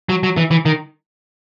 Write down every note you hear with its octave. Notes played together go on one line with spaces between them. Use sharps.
F#3
F#3
E3
E3
D#3